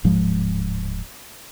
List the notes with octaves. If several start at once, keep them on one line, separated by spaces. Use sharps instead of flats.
D1 G#2 F3 G#3